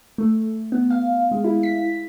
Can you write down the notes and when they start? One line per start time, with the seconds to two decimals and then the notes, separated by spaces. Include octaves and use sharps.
0.18 A3
0.72 B3
0.90 F5
1.31 G#3
1.44 E4
1.63 B6